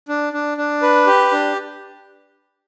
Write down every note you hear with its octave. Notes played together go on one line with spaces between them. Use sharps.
D4
D4
D4
B4
G4
D4